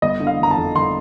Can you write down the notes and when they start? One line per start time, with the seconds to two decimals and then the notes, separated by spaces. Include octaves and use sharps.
0.02 G1 D#5
0.20 D3
0.27 F5
0.39 G1 A#5
0.51 A5
0.57 F2
0.75 G1 C6